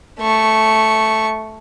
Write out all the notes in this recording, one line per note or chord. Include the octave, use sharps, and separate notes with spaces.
A3 C#6